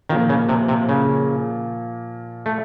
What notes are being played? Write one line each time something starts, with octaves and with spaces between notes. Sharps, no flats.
A#2 D#3 F3 A#3
C#3
C3
C3
C#3
A3